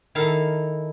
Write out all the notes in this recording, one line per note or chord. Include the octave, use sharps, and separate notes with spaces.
D#3 E4 A4 F5 A#5